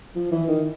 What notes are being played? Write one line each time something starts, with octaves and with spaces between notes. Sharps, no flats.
F3
E3
D#3